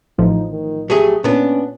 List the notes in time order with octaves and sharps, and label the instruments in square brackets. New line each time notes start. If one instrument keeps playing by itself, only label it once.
[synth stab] A1 A2 F3 [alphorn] D#4
[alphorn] D#3
[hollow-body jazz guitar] F#3 A3 G#4 [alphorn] G4
[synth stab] A#2 [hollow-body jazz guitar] B3 D4 [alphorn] C#4